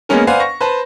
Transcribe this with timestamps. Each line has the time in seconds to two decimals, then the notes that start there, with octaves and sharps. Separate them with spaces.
0.09 G#3 A#3 B3 C#4 A#4
0.27 B4 C5 D5 F5 F#5 G#5
0.40 C#6 A#6
0.61 B4 C5 A5